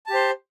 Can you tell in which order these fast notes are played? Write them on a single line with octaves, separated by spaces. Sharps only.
A5 G4 C5